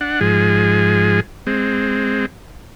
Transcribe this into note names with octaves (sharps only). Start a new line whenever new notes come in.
D4 F#5
G#2 F3 G#4
G#3 C4